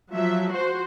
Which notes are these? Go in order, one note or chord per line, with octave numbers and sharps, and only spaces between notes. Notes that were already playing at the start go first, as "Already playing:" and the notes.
F3 F#3 E5
F#4 C5